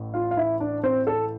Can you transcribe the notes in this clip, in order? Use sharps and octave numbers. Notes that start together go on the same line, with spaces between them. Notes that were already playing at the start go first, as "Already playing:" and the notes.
Already playing: A1 A2
F4 F5
F5
E4 E5
D4 D5
C4 C5
A4